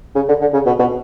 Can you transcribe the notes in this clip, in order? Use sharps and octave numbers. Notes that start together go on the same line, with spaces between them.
C#3
D3
D3
C#3
B2
B2